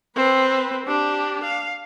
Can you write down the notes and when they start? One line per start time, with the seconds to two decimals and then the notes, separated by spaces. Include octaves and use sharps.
0.16 C4 B4
0.86 D4 G4
1.44 F5